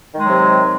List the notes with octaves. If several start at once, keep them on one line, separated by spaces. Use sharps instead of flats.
C3 D#3 F#3 G#3